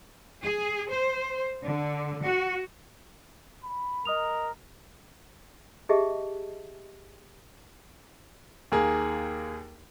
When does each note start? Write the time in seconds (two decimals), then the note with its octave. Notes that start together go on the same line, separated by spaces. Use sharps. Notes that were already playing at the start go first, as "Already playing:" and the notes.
0.44 G#4
0.91 C5
1.65 D3
2.23 F#4
3.64 B5
4.05 A#4 D#5 D#6 F7
5.89 G4 G#4 D#5 E5 A5
8.72 D#2 A#3 G#4